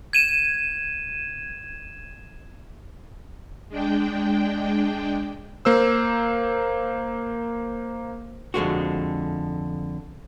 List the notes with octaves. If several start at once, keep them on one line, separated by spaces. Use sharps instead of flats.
G#6 D#7 E7
G#3 D4 G5
A#3 C5 E6
F2 D3 G#3 F#4